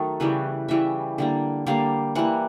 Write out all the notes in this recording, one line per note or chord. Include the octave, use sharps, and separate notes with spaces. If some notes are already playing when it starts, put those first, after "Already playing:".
Already playing: D#3 F#3 A3 A#4
C#3 E3 G3 B4
C#3 E3 G3 E5
D3 G3 A#3
D3 G3 A#3 F5
E3 G3 A#3 F#5